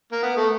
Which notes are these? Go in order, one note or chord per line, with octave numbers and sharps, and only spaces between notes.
A#3
B3
A3